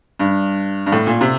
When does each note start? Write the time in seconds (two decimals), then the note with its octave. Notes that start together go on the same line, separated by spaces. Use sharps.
0.19 G2
0.86 G2
0.92 A2
1.07 A#2
1.21 C3